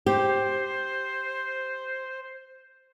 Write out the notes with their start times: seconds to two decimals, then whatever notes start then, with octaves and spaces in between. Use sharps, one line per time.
0.06 G4 C5